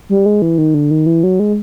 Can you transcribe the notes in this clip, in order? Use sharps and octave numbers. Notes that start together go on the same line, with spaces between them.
G3
G#3
E3
D#3
D3
D#3
E3
F#3
G#3